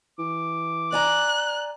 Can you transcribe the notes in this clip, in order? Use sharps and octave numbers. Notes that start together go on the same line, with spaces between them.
E3 D6
D5 G#5 A#5 F#6